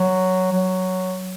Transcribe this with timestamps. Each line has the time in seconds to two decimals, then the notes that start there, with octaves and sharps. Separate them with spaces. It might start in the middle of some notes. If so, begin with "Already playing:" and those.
Already playing: F#3
0.52 F#3